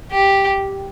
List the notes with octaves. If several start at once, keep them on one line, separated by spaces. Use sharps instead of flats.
G4